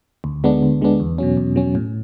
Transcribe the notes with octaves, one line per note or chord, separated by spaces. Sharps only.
D2
D3 G#3 B3 D4
D2
D3 G#3 B3 D4
E2
B2 F#3 C#4
E2
B2 F#3 C#4
A2